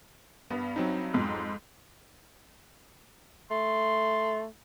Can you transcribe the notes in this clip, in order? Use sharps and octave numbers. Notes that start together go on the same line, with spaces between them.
G2 B3
F#3 C4 D#4
F2 G#2
A3 C6